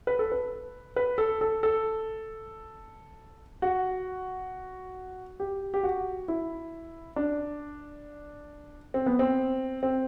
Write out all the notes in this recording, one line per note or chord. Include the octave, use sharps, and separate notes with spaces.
B4
A4
B4
B4
A4
A4
A4
F#4
G4
G4
F#4
E4
D4
C4
B3
C4
C4